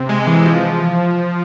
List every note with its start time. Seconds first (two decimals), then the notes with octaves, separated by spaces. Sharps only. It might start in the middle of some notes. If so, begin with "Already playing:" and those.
Already playing: C3
0.09 G#3
0.27 E3
0.46 F3